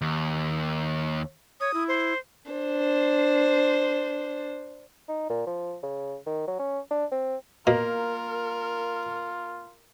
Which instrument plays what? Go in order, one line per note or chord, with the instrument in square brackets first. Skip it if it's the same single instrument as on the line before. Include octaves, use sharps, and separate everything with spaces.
[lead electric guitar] D#2
[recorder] C#5 [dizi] D#6
[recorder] E4
[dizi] C5
[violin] D4 C5
[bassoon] D#4
A#2
F3
C#3
D#3
F#3
C#4
D4
C4
[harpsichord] B2 [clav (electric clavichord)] A#3 [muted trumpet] F4 [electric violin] A#4